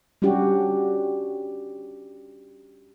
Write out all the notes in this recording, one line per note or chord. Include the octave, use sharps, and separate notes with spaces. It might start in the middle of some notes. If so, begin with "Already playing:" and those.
G3 C#4 D4 F#4 G4